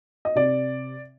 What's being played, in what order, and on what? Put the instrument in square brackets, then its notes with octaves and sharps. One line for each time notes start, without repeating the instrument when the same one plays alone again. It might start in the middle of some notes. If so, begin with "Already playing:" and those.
[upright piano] D#5
C3 D5